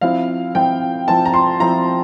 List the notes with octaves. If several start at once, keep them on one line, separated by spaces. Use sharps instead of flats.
F3 C4 E4 F5
F3 C4 E4 G5
F3 C4 E4 A5
A#5
C6
F3 C4 E4 A#5